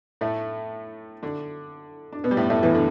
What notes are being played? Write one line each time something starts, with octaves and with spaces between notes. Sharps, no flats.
A2 A3
D3 D4
D4
B2 B3
G3
A2 A3
A2 A3
E2 E3
D3